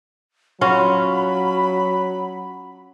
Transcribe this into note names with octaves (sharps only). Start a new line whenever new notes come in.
F#3 C#4 F4 F#4 B5